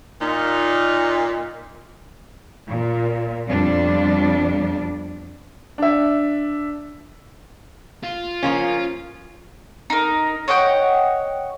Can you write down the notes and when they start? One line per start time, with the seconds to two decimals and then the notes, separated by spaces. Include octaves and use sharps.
0.21 A#2 D#4
2.69 A#2
3.47 F2 B2 G3 D4
5.78 D4 E5
8.04 F4
8.43 F3 A#3 C#4
9.90 D#4 A#4
10.48 C#5 D#5 F#5 G5